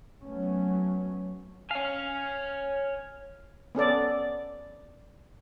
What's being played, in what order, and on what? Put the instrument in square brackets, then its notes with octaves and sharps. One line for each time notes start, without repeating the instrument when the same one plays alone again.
[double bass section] F#3 A3 B3 C#4
[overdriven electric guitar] C#5 G#5 [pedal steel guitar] F5
[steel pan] B3 C#4 A4 D5